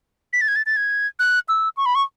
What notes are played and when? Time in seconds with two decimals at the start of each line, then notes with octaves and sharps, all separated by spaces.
0.33 B6
0.41 A6
0.48 G#6
0.56 A6
0.66 A6
0.76 G#6
1.19 F#6
1.49 E6
1.77 C#6
1.86 B5
1.95 C#6